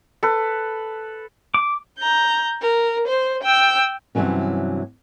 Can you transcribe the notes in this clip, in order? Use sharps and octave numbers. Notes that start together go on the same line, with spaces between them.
A4 B4
D6
A#5 G6
A#4
C5
G5 E6
G2 C3 D#3 E3 F#3 C#4